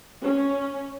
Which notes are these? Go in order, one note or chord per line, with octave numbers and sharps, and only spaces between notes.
C#4